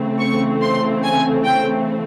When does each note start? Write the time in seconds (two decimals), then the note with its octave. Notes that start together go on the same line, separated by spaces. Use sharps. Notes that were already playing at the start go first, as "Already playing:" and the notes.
Already playing: C#3 E3 A3 C4
0.19 C#6
0.62 C6
1.04 G#5
1.45 G5